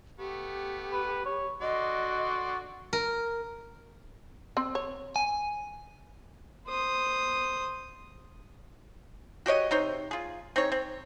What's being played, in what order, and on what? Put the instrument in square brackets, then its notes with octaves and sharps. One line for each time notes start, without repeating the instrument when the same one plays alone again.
[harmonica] A3 B3 [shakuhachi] G4
[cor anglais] B4
C#5
[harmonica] D3 D5 C6 [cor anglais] F#4 [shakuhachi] D#5
[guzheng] A#4
[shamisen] C4
C#5
[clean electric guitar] G#5
[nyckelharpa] C5 D#6
[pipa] F#4 G4 C#5 D#5
C3 D#4 C5 C#5
F4 G#4
C4 D#4 G#4 C#5
C4